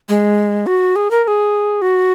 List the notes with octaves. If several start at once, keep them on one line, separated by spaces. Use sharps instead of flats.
G#3
F#4
G#4
A#4
A#4
G#4
F#4